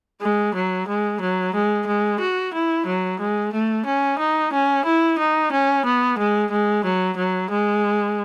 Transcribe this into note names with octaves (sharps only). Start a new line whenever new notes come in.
G#3
F#3
G#3
F#3
G#3
G#3
F#4
E4
F#3
G#3
A3
C#4
D#4
C#4
E4
D#4
C#4
B3
G#3
G#3
F#3
F#3
G#3